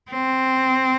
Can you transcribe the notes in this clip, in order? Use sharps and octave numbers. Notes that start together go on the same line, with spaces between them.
C4